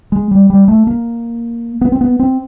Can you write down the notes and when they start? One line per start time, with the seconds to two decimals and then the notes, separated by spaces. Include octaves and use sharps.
0.12 G#3
0.31 G3
0.50 G3
0.68 A3
0.87 A#3
1.81 B3
1.92 C4
2.01 B3
2.19 C4